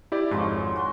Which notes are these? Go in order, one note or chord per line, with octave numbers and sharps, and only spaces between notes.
E4 G4 D5
G#1 F2 G#2 G#3 F4 C#5
F#4 F#5 C6